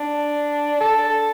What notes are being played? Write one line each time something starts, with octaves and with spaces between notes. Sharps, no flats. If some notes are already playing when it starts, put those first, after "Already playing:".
Already playing: D4
A4